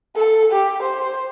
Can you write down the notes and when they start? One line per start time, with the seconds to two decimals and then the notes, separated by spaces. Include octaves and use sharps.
0.16 A4
0.51 G4
0.82 C5